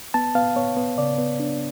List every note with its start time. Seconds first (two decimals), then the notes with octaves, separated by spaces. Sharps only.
0.14 B3 A5
0.35 B3 F5
0.56 B3 C#5
0.77 B3
0.98 C#3 D5
1.18 B3
1.40 D4